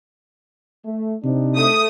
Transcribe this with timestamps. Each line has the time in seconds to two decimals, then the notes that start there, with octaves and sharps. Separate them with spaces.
0.85 A3
1.24 C3 C4 D4 D#4
1.55 A3 D#6